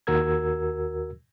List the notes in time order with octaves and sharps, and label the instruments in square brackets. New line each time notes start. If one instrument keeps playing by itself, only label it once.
[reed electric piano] D#2 F#4 A#4 E6 G#6